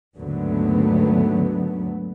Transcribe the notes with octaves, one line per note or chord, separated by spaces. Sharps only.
D#2 G#2 D3 F#3 A3 B3